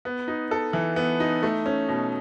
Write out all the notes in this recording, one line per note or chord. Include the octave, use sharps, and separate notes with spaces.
B3
D#4
A4
E3
B3
D#4
A3
C#4
B2